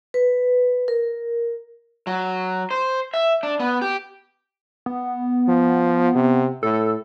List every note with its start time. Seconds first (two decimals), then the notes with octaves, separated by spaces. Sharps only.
0.14 B4
0.88 A#4
2.07 F#3
2.71 C5
3.14 E5
3.43 D4
3.60 B3
3.82 G4
4.86 B3
5.48 F3
6.15 C3
6.63 A2 A4